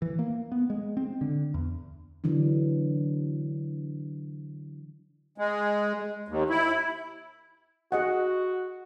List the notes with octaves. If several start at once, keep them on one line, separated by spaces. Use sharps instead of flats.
E3
A#3
B3
G#3
C4
D3
E2
D3 E3 F#3 D4
G#3
D#2
E4
F#4 G#4 D#5 F#5